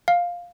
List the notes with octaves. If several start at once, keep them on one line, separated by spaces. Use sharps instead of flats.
F5